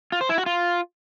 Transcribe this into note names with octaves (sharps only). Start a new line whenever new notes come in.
F4
C5
E4
F#4
F4